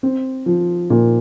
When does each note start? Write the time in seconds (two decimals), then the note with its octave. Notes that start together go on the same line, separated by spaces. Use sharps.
0.03 C4
0.46 F3
0.90 A#2